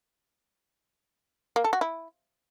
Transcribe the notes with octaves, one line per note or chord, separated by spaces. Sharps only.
A#3
A4
F#4
E4